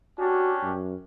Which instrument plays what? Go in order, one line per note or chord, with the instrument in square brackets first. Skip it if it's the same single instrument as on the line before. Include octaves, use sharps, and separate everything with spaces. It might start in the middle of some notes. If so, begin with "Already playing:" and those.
[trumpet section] C#4 D4 G4 [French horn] F#4
[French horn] F#2